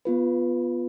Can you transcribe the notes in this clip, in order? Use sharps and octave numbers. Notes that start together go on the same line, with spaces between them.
B3 F4 B4